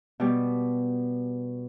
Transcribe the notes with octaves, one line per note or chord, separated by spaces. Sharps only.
B2 G3